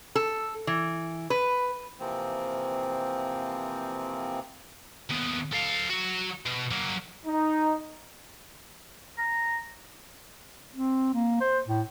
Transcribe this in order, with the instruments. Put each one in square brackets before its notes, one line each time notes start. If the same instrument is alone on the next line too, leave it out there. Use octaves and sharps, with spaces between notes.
[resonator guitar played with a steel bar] A4
E3
B4
[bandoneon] C3 E3 F3 A#3 C4
[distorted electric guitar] D#2 B3
A4 F5
F#3 F#4
B2
F#3 A#3
[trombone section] D#4
[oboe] A#5
[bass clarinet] C4
A#3
C5
A2